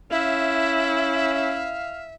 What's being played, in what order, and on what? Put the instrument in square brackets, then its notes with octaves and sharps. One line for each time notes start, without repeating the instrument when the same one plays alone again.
[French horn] C#4 [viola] E4 [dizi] E5 [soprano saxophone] F5